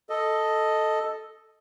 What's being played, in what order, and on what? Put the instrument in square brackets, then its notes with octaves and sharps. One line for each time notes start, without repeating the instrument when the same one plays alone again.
[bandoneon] A4 D#5